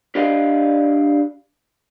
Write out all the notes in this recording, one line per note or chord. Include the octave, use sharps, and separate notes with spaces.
D4 G4 D5 D#5 F5